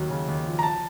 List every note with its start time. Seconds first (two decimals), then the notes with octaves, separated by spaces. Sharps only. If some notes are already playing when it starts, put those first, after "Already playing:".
Already playing: D#2 F#3
0.10 C#3
0.28 D#2
0.45 F3
0.59 A#5
0.63 A5